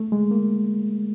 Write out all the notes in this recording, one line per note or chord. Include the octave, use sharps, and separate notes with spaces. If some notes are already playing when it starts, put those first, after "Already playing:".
Already playing: A3
G#3
A#3